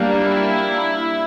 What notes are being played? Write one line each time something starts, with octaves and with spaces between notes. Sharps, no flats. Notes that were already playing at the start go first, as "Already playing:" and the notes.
Already playing: G3 A#3 D4
E4